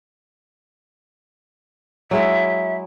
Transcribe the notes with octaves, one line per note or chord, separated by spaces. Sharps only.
F#3 G#3 E4 E5